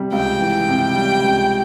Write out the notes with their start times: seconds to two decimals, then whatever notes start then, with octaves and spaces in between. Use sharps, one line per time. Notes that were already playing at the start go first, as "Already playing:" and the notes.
Already playing: C3 G3
0.12 C#2 G5
0.40 E3
0.54 G5
0.68 C3
0.96 G3
1.24 C#2